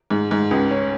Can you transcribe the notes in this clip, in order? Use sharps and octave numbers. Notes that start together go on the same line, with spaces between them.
G#2
G#2
C#2
C#4